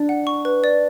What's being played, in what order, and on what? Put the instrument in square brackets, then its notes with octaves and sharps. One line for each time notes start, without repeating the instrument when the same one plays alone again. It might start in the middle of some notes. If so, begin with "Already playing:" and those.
Already playing: [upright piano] D4 [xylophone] D5
[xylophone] F#5
C#6
B4
D5